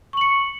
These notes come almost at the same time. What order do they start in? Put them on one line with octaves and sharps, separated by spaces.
C#6 F#7 C#7